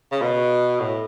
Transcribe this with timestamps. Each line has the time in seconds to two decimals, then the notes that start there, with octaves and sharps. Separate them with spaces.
0.12 C#3
0.22 B2
0.80 A2